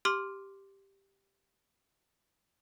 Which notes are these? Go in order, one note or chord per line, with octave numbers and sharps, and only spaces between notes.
G4 C6 D6 F6